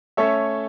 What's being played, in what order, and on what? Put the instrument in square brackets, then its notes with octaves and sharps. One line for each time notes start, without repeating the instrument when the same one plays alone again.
[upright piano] A3 C#4 A4 C#5 E5